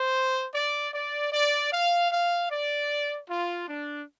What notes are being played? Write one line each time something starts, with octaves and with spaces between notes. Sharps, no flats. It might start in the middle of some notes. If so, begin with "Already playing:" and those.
Already playing: C5
D5
D5
D5
F5
F5
D5
F4
D4